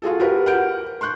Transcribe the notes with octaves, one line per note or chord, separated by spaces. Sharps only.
F4 F#4 G#4 A4
F#4 G4 A#4 B4
F#5 F6 G6 D7
C6 C#6 F#6 G6